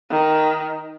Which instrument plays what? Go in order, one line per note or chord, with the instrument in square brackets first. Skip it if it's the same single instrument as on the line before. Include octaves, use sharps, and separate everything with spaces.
[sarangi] D#3